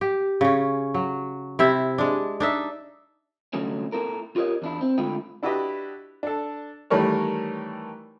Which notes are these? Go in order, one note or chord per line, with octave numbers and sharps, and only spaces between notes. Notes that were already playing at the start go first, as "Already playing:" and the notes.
G4
C#3 C#4
F#3
C3 E4 E5
G#3 D4
D4 D#4 E5
C2 D3 F#3 A3 C#4
A#3 E4 A4 A#4
F4 G4 A#4 C#5 D#5
E2 D4 E4
C4
D2 D3 G#3 E4 F4 G5
D4 E4 F#4 G4 B4 D#5
D4 A4
D#3 E3 G3 A3 A#4 C#5